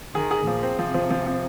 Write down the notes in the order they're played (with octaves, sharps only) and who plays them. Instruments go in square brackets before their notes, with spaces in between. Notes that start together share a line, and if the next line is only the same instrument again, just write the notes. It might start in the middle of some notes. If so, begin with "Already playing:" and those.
[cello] D#3 [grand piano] G#4
[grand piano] G#4
[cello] A#2 [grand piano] F3
[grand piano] C4
[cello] C3 [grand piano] F3
[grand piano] F3
F3
F3